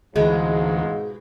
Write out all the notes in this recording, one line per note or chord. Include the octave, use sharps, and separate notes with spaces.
D2 G#2 B2 E3 G#3 C4 F4